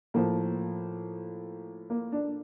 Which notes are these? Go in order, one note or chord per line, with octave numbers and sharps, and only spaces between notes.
A2 F3 A#3
A#3
D4